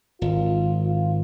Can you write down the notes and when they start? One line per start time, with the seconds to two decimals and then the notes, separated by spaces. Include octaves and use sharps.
0.22 G#1 F4
0.86 F4